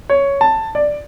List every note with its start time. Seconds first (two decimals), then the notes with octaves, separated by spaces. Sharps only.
0.10 C#5
0.41 A5
0.75 D5